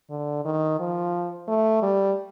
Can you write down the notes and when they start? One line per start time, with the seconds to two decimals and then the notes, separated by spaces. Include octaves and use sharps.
0.10 D3
0.45 D#3
0.79 F3
1.48 A3
1.82 G3